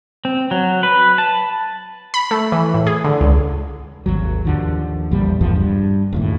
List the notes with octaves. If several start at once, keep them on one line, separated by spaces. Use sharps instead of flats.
C4
F#3
B4
A5
B5
A3
E3
A2
G#4
D3
C#2
G#1 D#2 F#3
D#2 D3 F3
A#1 E2 A#2 G3
G#1 E2 G2 F3
G2
F#1 D#2 A2